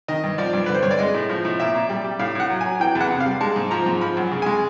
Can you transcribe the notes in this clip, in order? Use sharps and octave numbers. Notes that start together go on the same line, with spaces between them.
D#3 D#5
G2
F3 D5
G2
D3 B4
C5
G2 C#5
D5
G#3 D#5
A2
F3
A2
A#2 E5
A#2
G3
G3
A2 F5
A2 F#5
F#3
F#3 G#5
E3 G5
E2
F#5
C3
F5
G3
G#3 A5
G#2
F3 A#5
G#2
F3 B5
F#2
C#3
G#3 G#5